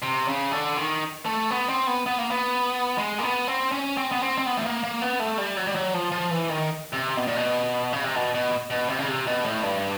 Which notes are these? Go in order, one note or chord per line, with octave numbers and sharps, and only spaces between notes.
C3
C#3
D3
D#3
A3
B3
C4
B3
B3
A#3
B3
G#3
A#3
B3
C4
C#4
C4
B3
C4
C4
B3
A3
A#3
A#3
B3
A3
G3
F#3
G3
F#3
F3
F3
E3
D#3
C3
B2
A#2
B2
C#3
C3
B2
B2
B2
C3
C#3
C3
B2
A2
G2